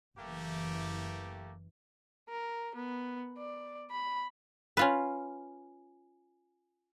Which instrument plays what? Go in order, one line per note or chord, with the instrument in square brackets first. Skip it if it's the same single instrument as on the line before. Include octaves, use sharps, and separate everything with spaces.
[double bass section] F#1 E3 [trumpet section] A3 A#3 G4
[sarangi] A#4
B3
D5
B5
[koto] C#4 F4 B4